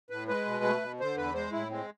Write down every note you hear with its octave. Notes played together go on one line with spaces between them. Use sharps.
A2 B4
G#3 B4
B2
A3
B2
D3 C5
E2 B4
G#3 C5
A2 E4
G#3 C4